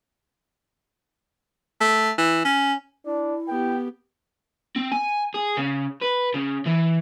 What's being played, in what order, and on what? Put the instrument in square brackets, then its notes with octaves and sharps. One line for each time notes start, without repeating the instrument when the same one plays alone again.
[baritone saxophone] A3
E3
C#4
[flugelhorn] D4 [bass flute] E4
[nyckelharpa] B3 G4 [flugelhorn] G5
[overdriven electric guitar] C4
G#5
G#4
C#3
B4
C#3
E3